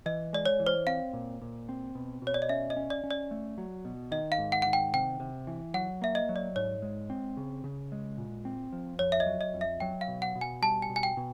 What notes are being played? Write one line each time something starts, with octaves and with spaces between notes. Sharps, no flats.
E3 D#5
G#3 D5
C#5
E3
C5
C4 F5
A#2
A#2
C4
B2
B2
C#5
D5
D#5
C#4 E5
D#5
C#4
D5
C#4
D5
A3
F#3
B2
D#3 D#5
F5
G#2
F#5
D#3 F#5
G5
C3 G5
C3
E3
F#3 F#5
A#3 E5
D#5
F#3
D5
G#2 C#5
G#3
C4
C#3
C#3
G#3
A#2
C4
F3
F2 C#5
E5
D#5
F#3
D#5
F2
E5
F#3 G5
F5
B2
F#5
B2
G#5
G3 A5
G#5
B2
G#5
G5
B2